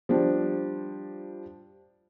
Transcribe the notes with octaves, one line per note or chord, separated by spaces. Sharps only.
F3 G3 D4